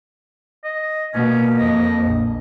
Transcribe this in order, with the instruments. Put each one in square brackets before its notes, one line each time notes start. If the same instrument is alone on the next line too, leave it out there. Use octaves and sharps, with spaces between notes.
[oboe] D#5
[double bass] B2 [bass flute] A#3 [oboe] C#4
[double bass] F2 [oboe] D#5
[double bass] A#1